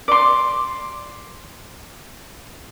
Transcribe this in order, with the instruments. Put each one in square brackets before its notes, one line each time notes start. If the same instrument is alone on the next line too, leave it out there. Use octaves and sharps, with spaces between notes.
[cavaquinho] D5 C6